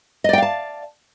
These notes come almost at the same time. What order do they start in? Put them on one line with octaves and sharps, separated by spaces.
D#5 D5 G5 F5 A5